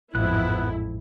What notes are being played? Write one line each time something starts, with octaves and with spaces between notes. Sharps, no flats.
A1 F2 G#2 F3 B3 E4 F#6